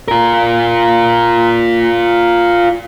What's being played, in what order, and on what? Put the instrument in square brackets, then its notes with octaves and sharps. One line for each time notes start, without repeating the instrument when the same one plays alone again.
[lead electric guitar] F4 A#4